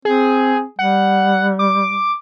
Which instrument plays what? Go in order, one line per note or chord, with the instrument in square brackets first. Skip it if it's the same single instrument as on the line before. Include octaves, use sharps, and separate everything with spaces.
[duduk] C4 [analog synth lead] G#4
[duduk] G3 [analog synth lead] F#5
[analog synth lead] D6